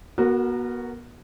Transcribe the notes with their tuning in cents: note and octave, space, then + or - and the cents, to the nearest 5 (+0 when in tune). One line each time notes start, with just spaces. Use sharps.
B3 -35 F#4 +0 A#4 -15